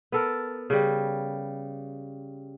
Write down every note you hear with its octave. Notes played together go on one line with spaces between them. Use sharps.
B3 A4 A#4
C#3 G3